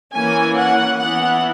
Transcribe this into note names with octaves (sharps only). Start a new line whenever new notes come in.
E3 A#3 C#4 G#5
F#5
E3 B3 F#5